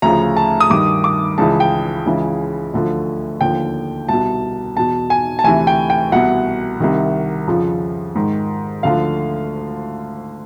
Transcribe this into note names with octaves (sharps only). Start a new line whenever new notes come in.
D2 C#3 F3 A#5
A5
D#6
G2 D#3 D6
D6
C#2 C#3 E3 A5
G5
C#2 C#3 E3
D2 D3 F3
D#2 D3 F3 G5
C2 B2 A5
E2 B2 A5
G#5
A5
D2 C3 E3 G#5
G5
G5
C2 B2 F#5
C2 C3 D#3
F2 C#3 F3
G#2 D#3
D2 D3 F3 F5